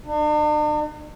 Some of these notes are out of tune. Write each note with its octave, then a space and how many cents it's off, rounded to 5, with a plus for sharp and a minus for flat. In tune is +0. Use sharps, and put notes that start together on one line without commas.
D4 +45